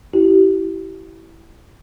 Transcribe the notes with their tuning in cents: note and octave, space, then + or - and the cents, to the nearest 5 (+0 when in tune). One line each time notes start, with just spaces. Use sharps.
E4 +0 G4 -35